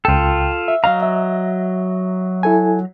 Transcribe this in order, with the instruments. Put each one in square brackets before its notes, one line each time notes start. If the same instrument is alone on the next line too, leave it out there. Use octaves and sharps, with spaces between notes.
[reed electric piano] C#2 G5 [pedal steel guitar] F4 A4
[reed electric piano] E5
[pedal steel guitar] F#3 D#5 A#5 [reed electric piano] F5
[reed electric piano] E5
E4 A4 G#5